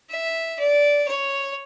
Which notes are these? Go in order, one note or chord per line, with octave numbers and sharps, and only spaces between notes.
E5
D5
C#5